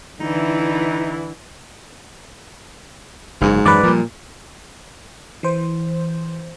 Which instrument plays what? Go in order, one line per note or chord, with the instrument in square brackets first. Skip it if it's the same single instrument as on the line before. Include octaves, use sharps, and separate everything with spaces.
[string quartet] D3 E3 E4 [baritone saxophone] D#4
[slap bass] F#1 C3 F#3 [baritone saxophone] G#2
[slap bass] F#2 E3 F#3 [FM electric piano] B4 D5
[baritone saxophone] A#2 [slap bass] F3 G3
[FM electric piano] E3 C5